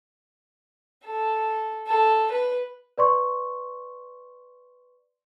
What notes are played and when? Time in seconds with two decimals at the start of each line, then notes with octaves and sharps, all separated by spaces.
1.05 A4
1.88 A4
2.31 B4
2.98 B4 D5 C6 C#6